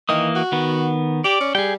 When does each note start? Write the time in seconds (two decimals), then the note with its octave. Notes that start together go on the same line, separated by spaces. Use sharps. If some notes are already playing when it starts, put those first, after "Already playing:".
0.09 D#3 E3 A#3 D#6
0.36 F#4
0.52 D#3 B3
1.24 G4 D5
1.40 C#4
1.55 G3 G#4 G5